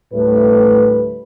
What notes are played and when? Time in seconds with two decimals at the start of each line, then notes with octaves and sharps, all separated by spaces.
0.13 D2 A2 G3 A3 B4